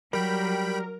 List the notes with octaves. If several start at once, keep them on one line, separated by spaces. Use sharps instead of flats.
F#3 G3 G4 A#4 G5 B5